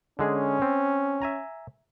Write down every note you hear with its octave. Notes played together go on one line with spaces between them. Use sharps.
D3 G#3 C#4 G#4
C4
E5 G#5 A#5